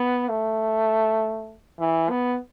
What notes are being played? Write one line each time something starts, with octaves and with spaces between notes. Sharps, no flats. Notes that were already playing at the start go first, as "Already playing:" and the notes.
Already playing: B3
A3
E3
B3